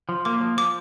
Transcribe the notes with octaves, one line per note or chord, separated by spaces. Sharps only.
F3
A#3 D6
F3
F3 D6